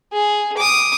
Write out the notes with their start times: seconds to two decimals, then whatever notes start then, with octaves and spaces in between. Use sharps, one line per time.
0.13 G#4
0.57 D6 D#6